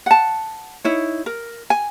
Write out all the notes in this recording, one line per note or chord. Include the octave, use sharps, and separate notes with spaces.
F#5 A5
D#4 E4 C#5
A#4
G#5